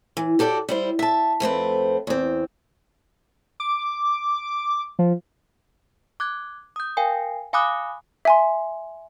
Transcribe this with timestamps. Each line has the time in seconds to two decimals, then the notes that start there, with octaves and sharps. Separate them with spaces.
0.17 E3
0.39 F#4 G4 A4 B4 D5
0.69 G3 E4 C5
0.99 E5 A5
1.40 F2 A3 C4 B4
2.07 E2 C4
3.60 D6
4.99 F3
6.20 D6 F#6 G#6
6.76 D#6 G6
6.97 A#4 F5 G5 G#5
7.53 F5 G#5 B5 D6 D#6 F#6
8.25 E5 G#5 C6